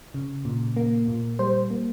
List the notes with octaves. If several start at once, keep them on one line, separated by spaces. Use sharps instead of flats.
C#3
A#2
A#3
A#2
G3 C5
A#3